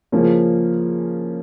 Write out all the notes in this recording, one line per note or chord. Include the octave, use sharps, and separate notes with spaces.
C#3 F3 A#3 C#4